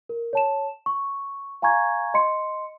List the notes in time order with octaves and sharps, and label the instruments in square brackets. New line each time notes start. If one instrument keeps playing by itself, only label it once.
[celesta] A#4
C#5 A5 E7
C#6
F5 G#5 A#5 C#6 G#6
D#5 C6 C#7